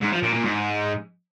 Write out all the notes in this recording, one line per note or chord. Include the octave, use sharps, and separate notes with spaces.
G#2
F3
A#2
A#2
G#2